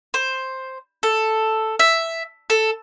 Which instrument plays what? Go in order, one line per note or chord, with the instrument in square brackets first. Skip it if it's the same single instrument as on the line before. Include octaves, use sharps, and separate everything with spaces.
[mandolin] C5
A4
E5
A4